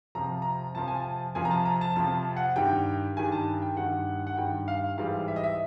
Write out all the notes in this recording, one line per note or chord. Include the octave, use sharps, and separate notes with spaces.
F2 C3 F3 A#5
A#5
F2 C3 F3 A5
G#5
A5
F2 C3 F3 G#5
A#5
A5
A#5
A5
F2 C3 F3 A5
F#5
G2 D#3 G3 G5
G2 D#3 G3 G#5
A5
G5
G2 D#3 G3 F#5
F#5
G2 D#3 G3 G5
F5
G#2 E3 G3 F5
E5
D#5
E5